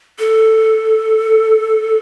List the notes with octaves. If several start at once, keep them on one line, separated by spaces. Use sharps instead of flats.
A4